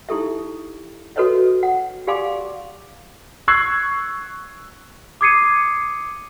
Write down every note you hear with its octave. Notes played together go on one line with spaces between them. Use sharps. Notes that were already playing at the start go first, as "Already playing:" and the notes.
D#4 E4 G4 A4 E5
F#4 A4 B4 C#5 D#5 E5
F#5
G4 D5 F5 G#5 C6 D6
C#6 E6 F#6 G#6 C7
D6 D#6 G#6 C7 C#7 D#7